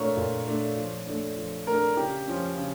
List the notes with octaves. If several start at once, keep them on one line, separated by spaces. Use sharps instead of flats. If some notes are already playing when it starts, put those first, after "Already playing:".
Already playing: A#2 A3 D4 A#4 C#5 F5
A#2
A3 D4
F3
A3 D4
F3
A3 D4 A#4
C#3 G4
F3 C#4
C#3